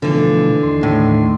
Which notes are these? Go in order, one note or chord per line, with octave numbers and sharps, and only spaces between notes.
B2 D3 E3 F3 A3
D#2 C6
A2